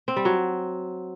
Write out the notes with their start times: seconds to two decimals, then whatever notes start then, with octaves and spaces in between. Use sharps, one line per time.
0.08 C4
0.16 G3
0.25 F#3